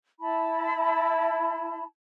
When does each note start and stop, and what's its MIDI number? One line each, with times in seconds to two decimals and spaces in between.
0.20 1.84 64
0.20 1.84 81
0.20 1.84 83